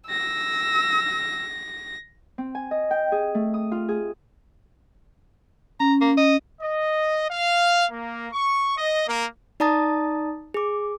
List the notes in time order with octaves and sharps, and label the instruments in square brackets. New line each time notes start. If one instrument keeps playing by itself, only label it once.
[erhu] E6 [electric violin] A#6
[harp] C4
G#5
D#5
G5
G#4
A3
D#6
F4
G#4
[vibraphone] C#4 [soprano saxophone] A#5
[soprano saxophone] A#3
D#5
[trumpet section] D#5
F5
A#3
C#6
D#5
A#3
[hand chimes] D#4 D5 A5 A#5 D#6 A6
G#4 D6